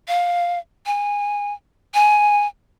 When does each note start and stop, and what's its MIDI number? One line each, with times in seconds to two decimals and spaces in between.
0.08 0.59 77
0.86 1.53 80
1.94 2.47 80